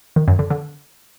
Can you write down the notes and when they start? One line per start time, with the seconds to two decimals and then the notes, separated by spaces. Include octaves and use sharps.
0.16 D#3
0.28 F#2
0.39 D3
0.50 D3